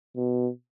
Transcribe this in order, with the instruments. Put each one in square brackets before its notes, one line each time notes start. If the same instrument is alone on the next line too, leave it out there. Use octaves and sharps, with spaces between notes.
[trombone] B2